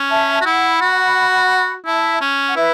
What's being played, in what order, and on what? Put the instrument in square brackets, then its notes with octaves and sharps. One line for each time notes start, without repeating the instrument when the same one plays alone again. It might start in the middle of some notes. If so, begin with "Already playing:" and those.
Already playing: [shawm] C#4
[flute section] E5 A5
A5
[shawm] F#4
[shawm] E4 [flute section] F#5 B5
[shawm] F#4
[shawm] E4 [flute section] E5 A5
[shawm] C#4
[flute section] F#5
[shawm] E4 [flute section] B4 E5